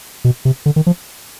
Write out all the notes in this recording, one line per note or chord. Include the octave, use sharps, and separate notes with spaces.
B2
C3
D3
D#3
F3